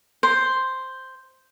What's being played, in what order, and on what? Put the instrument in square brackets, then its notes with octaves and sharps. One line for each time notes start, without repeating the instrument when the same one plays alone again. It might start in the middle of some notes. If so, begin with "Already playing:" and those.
[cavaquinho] C5